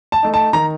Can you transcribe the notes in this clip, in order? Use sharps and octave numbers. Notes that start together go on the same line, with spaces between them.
A5
A3 D#4
A5
D#3 A#5